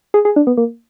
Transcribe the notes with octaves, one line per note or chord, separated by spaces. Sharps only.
G#4
G#4
D4
B3
A#3